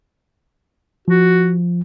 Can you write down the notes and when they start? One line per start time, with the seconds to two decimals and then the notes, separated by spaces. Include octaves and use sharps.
1.08 F3 F#4